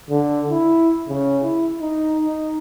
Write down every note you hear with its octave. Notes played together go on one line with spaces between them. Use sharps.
D3
E4
C#3
E4
D#4
D#4